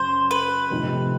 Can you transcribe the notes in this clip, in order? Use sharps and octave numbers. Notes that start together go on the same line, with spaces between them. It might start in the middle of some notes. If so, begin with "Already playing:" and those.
Already playing: F#2 C#3 F#3 C5
B4
F1 F2 C3 D#3